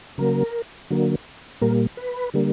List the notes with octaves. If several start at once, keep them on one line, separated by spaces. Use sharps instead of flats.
C#3 F#3 A#3 A#4
D3 F#3 A#3
A#2 G3 A#3 A#4
B4
D3 G3 A#3